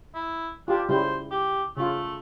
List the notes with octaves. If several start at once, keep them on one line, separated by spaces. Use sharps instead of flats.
E4
D4 F4 G4
C#3 G3 E4 C5
G4
C#3 A3 F4